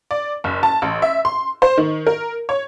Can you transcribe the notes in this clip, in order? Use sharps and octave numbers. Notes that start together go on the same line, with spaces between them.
D5
F#1
A5
A1
E5
C6
C5
D#3
A#4
C#5